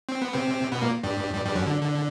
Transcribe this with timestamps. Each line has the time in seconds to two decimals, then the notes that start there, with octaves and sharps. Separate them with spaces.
0.09 C4
0.22 B3
0.34 C3 C4
0.72 B2 B3
0.82 A#2 A#3
1.03 G2 G3
1.34 G2 G3
1.45 G2 G3
1.55 F#2 F#3
1.67 D3
1.82 D3